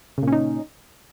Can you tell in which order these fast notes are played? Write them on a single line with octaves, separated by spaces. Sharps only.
C#3 A#2 C#4 D#4